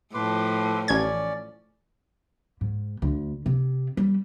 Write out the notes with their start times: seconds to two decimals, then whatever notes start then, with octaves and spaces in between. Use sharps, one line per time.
0.14 A2 F3 B4 C6 D6
0.88 A1 C#4 D5 G#6
2.61 G#2
3.02 D2
3.46 C3
3.97 G3